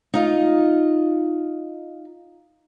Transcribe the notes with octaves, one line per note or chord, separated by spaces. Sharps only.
D#4 F4 D#5